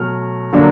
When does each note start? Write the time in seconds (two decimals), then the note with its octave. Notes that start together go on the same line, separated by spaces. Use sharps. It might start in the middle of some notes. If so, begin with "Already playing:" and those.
Already playing: B2 F#3 A3 F6
0.53 D3 F#3 A#3 D4